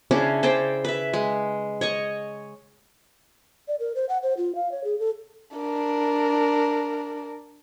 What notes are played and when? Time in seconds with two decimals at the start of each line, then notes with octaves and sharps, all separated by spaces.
0.11 C#3 C#4 D4 E4
0.43 C#3 C5 D5 G5
0.85 B4 E5
1.13 G#3
1.81 C#5 D#5 C#6
3.68 D5
3.80 A#4
3.95 C5
4.09 F#5
4.23 C5
4.37 F4
4.55 F5
4.72 C#5
4.84 G#4
4.99 A4
5.57 D4 A#4